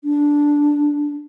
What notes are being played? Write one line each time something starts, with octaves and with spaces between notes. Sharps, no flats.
D4